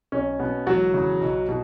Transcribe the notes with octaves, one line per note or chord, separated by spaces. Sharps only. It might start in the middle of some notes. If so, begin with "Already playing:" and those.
B1 C#4
B2 B3
E1 F#3 F#4
E2 C#3
B1
B2